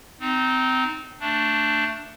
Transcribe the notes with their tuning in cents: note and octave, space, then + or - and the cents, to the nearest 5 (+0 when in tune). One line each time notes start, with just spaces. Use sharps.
C4 -25 D#4 -5
A3 +15 D4 +0